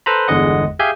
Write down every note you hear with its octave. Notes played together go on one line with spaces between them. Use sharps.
A4 B4 C5 A#5 B5
G1 E2 D3 G#3 D#5 F#5
G4 G#4 E5 F5 G#5 G6